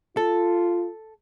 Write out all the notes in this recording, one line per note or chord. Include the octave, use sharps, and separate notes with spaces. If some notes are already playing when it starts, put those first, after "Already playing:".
F4 A4